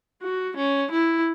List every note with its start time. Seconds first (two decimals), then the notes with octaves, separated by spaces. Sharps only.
0.22 F#4
0.57 C#4
0.91 E4